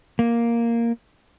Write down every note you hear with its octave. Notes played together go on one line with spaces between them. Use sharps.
A#3